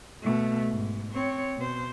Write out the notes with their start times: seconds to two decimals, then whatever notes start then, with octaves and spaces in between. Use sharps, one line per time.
0.22 B2 A3
0.69 G#2
1.13 C4 C#5
1.57 B2 C5